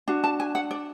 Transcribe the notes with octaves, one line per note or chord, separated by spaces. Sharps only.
D4 F#4
A5
G#5
F#5
D5